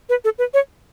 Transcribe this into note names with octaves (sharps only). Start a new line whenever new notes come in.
B4
A4
B4
C#5